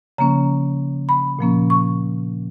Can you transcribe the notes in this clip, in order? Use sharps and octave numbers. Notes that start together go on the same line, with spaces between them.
C#3 F3 A#3 C#4 A#5
B5
A#2 F3 A#3 C#4
C#6